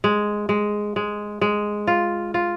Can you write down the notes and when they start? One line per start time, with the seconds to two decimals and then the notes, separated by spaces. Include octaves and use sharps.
0.04 G#3
0.49 G#3
0.96 G#3
1.41 G#3
1.87 F4
2.34 F4